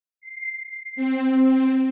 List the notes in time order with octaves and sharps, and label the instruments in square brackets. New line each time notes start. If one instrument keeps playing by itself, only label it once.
[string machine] C7
C4